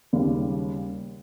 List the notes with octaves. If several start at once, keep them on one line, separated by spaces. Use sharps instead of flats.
D#2 C#3 G3